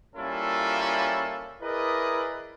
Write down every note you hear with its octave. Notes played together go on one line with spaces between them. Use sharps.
G3 A#3 C#4 E4 F4 A4
E4 G#4 A#4 B4 D5 D#5